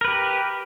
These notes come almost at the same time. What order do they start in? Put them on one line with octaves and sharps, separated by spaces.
A#4 B4 G4